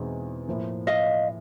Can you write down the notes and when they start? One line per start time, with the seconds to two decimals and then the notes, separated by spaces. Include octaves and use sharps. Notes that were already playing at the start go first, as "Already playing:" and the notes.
Already playing: E2 B2 G#3 C4 D#4
0.48 A2 F3 A#3
0.87 D#5 F5